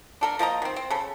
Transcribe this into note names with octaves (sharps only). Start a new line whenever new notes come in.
D4 A4 A#4
F3 A#3 D#5 A#5
D#3 C4
C4
C#3 A4